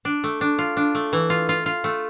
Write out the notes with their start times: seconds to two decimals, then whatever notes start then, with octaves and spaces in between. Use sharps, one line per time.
0.05 D4
0.24 A3
0.41 D4
0.59 F4
0.77 D4
0.95 A3
1.13 E3
1.30 F4
1.49 F4
1.66 F4
1.84 A3